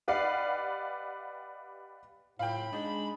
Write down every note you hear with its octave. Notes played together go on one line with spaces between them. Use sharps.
G4 B4 D5 D#5 F5 F#5
F#1 E2 A2 F4 F5 G5 B5
G#3 D4 D#4